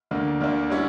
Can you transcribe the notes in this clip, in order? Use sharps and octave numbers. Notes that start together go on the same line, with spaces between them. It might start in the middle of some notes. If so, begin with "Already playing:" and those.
D2 D3 A#3 D4
D2 D3 A#3 D4
D3 G3 C#4 E4